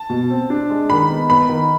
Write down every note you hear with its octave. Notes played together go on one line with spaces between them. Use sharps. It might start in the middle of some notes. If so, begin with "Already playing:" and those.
Already playing: A5
B2
C4
D4
G#3
D#3 B5
B3
B3 B5
D#3